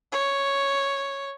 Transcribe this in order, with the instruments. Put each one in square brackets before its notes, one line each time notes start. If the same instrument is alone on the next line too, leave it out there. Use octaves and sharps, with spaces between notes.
[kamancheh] C#5